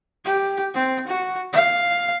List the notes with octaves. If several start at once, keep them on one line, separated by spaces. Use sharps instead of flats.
G4
C4
F#4
F5